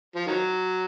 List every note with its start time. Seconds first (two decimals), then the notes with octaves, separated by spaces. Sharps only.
0.16 F3
0.27 D#3 F#3